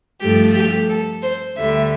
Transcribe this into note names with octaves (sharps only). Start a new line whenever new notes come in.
G2 F3 A3 G4
G4
A4
C5
D2 D3 G3 E5